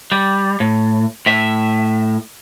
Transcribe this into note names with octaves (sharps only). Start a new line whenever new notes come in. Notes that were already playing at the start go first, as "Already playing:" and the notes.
G3
A2
A2 E5